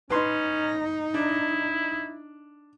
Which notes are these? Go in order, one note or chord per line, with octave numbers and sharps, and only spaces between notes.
C#4 D#4 B4 C6
D4 E4